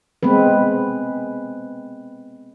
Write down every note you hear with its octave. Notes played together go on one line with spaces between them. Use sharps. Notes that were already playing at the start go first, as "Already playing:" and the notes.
G#3 B3 C4 B4